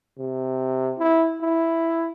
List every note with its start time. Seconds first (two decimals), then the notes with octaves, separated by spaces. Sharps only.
0.19 C3
0.98 E4
1.41 E4